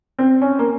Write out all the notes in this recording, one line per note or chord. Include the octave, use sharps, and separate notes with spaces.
C4
C#4
A#3